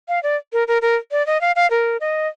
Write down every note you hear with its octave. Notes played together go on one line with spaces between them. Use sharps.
F5
D5
A#4
A#4
A#4
D5
D#5
F5
F5
A#4
D#5